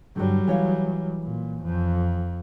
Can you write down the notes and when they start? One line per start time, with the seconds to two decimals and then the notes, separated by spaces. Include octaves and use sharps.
0.16 G2 D3 F#3 G3
0.47 E3 C#5 F5
1.22 A#2
1.63 F2